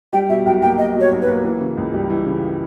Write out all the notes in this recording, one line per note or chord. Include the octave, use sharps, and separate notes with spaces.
G3 G5
B2 E5
B1 G5
A#3 G5
G3 D#5
B2
C#5
B1
B4
A#3
E3
C#3
C#2
G3
E3
C#3